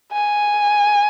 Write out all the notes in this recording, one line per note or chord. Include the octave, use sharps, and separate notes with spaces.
G#5